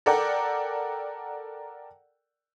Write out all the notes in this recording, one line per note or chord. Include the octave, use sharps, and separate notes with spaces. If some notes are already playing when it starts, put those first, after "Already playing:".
A4 A#4 D5 F#5 G5